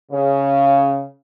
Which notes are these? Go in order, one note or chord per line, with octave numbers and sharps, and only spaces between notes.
C#3